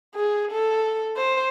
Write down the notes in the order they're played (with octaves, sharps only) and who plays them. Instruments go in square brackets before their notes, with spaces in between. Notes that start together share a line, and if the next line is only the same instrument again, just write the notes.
[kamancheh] G#4
A4
C5